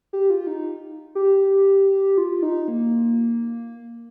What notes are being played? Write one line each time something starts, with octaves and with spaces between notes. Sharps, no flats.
G4
F4
D#4
G4
F4
D#4
A#3